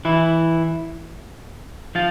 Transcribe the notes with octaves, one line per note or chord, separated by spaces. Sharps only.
E3 E4
F3 F4